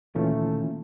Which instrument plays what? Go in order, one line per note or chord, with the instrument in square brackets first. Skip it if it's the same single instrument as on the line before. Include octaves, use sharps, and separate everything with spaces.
[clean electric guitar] D2 A#2 D#3 [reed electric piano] E3 C#4 F4 [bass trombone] A3